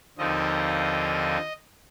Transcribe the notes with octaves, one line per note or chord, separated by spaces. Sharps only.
D#2 D3 F3 C4 D#4 D#5